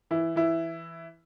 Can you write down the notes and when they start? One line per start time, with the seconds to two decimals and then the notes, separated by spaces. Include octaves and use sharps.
0.11 E3 E4
0.36 E3 E4